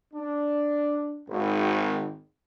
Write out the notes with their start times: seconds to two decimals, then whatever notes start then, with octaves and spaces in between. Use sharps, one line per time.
0.14 D4
1.27 G#1